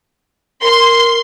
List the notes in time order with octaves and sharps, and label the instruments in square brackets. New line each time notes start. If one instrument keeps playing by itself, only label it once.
[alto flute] A#4 [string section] C6